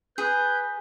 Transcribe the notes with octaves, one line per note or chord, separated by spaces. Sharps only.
G#4 B4 G6